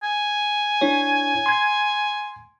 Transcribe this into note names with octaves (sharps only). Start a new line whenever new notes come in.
G#5
D4 E4 C#5
C6 G#6